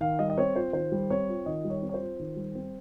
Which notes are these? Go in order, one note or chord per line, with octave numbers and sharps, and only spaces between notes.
D#3 F5
G3 D#5
D#5
C4 C#5
F4 C5
D#3 C5
G3
C4 C#5
F4
D#3 D#5
G3
C#5
C4
C#5
C5
F4
D#3
G3
C4